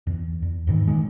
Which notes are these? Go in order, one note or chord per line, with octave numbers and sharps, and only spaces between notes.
E2
E2
D#2 G#2 D#3 E3
A2 D#3 G#3